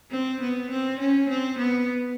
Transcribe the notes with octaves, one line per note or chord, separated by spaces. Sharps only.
C4
B3
C4
C#4
C4
B3